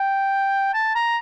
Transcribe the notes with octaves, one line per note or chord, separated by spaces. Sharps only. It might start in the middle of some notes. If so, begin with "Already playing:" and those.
Already playing: G5
A5
A#5